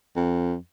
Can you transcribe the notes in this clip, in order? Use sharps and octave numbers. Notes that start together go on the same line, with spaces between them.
F2